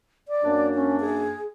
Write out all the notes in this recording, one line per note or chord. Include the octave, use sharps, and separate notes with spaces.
D5
F#2 A#3 D4
C#4
G#4